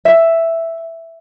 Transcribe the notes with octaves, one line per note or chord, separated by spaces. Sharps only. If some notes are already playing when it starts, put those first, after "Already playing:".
E5